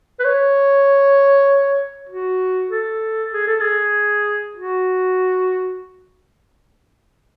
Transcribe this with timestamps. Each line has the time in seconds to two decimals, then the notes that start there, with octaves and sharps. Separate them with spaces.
0.20 B4
0.25 C#5
2.09 F#4
2.71 A4
3.34 G#4
3.47 A4
3.61 G#4
4.57 F#4